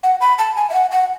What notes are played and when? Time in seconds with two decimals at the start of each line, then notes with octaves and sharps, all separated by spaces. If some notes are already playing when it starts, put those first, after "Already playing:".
0.03 F#5
0.21 B5
0.38 A5
0.56 G#5
0.70 E5
0.74 F#5
0.91 F#5